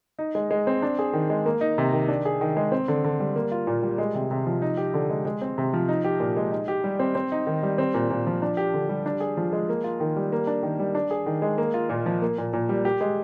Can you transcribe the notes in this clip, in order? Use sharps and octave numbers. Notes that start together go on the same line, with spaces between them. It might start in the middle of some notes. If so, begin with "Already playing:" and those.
D#4
G#3
G#3
C4
D4
G#4
D#3
G#3
A#3
D#4
C3
D#3
D4
G#4
D#3
G#3
C4
D3
D3
G3
A#3
F4
A#2
G3
G#3
C3
C3
F3
D#4
G4
D3
G#3
G#3
C4
C3
F3
D#4
G4
A#2
G#3
D#4
G4
G3
C4
C4
D#4
D#3
G3
C4
A#2
A#2
F3
D4
G4
D3
G3
D4
G#4
F3
G#3
A#3
F4
D#3
G3
A#3
D4
D#3
G3
D4
G#4
D#3
G#3
A#3
F4
A#2
F3
A#3
A#2
A#2
G3
G4
G#3